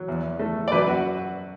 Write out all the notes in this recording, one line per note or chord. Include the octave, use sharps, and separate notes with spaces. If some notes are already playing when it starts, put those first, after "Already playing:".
Already playing: F#3
E2
A3
D5
F#2 B4
F#4